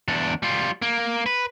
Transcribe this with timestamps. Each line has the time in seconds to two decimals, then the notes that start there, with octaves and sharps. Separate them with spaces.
0.08 E2 D4
0.43 G3 F4
0.82 A#3
1.26 B4